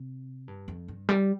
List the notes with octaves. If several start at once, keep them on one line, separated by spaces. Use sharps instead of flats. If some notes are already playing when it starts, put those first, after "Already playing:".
Already playing: C3
G2
F2
G2
G3